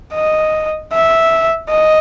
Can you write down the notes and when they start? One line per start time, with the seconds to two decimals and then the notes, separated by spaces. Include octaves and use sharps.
0.14 D#5
0.93 E5
1.70 D#5